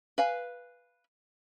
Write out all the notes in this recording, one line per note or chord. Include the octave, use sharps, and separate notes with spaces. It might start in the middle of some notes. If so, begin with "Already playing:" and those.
B4 F5 G#5